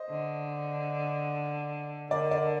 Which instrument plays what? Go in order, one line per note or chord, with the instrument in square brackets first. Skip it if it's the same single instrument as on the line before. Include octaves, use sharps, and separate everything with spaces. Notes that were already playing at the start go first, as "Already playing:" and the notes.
Already playing: [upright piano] C5 D#5
[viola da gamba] D3
[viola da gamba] D3 [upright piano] A#4 D5
[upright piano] A#4 D5